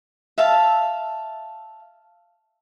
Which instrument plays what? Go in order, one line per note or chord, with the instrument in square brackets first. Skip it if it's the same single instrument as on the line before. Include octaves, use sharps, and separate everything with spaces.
[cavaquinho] E5 F5 A5